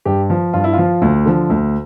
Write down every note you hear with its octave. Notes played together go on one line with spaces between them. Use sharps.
G2 G4
F3
G2 F4
E4
F3 F4
D2
D3 F3
D2